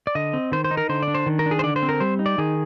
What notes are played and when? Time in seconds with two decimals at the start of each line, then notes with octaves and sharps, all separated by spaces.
0.07 D5
0.15 D3 D#5
0.33 C4
0.52 D#3 C5
0.64 C5
0.71 D#4
0.77 A#4
0.89 D3 C5
1.03 D5
1.08 D4
1.14 C5
1.26 D#3
1.39 A#4
1.46 D4
1.51 G#4
1.59 C5
1.63 D3 D5
1.76 C5
1.83 C4
1.89 A#4
2.00 G3 C5
2.19 D#4
2.26 D5
2.38 D#3 G#4